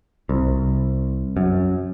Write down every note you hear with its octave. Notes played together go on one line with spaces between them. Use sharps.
C2
F#2